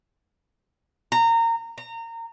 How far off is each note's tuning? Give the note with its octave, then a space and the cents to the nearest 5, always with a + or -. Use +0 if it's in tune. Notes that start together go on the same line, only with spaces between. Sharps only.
A#5 -25
A#5 -25